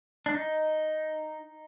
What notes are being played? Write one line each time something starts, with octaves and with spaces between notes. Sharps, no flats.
D4
D#4